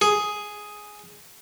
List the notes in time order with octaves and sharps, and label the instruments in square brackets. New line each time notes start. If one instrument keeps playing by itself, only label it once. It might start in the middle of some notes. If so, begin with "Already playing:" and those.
[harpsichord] G#4